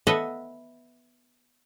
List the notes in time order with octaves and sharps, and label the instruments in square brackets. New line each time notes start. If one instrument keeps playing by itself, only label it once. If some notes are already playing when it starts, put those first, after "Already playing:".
[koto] B3 A4 B4 D#5 E5 F#5